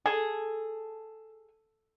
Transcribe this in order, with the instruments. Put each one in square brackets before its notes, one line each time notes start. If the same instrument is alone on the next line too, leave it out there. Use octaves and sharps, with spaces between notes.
[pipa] G#4 [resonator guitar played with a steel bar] A4